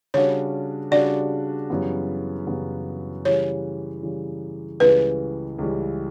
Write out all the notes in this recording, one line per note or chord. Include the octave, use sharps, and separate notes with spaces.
C#3 G3 D4 F#4 C#5
C#3 G3 D4 F#4 D5
F#2 C#3 E3 G3 B3
F#2 C#3 E3 G3 B3
C#3 E3 G3 C#5
C#3 E3 G3
C#2 C#3 E3 G3 B4
C#2 C#3 E3 G3